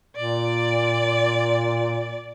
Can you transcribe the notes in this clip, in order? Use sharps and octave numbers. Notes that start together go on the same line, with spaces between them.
A#2 D5